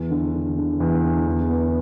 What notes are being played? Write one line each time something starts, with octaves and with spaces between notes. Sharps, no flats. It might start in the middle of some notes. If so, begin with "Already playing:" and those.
Already playing: E2
D3
D3
D3
E2
D3
E2
B3